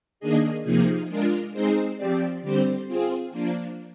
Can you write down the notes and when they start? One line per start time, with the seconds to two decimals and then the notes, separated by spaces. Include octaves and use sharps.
0.20 D#3 A#3 D4 G#4 D#5
0.64 C3 F3 A#3 D#4 G#4
1.09 G#3 D4 F4 A#4
1.53 G#3 C4 D#4 G#4 C5
1.96 F3 C4 G4 D5
2.42 D3 G3 C4 G4 C5
2.86 C4 F4 G#4
3.31 F3 A#3 D4